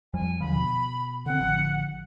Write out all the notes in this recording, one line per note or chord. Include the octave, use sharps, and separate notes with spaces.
F2 F3 G3 G#5
D#2 D3 F3 B5
B2
D3 C4 F#5
A1 D3 F3